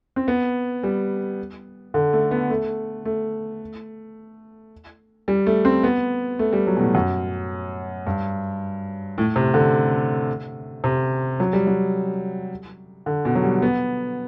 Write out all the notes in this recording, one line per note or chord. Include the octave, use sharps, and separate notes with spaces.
C4
B3
G3
D3
A3
B3
A3
A3
G3
A3
C4
B3
A3
G3
F#3
B2
A2
F#2
G2
A2
C3
D3
C3
F#3
G3
F#3
D3
B2
F#3
G3
B3